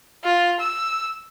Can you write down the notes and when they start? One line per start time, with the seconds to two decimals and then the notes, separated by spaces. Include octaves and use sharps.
0.24 F4
0.60 E6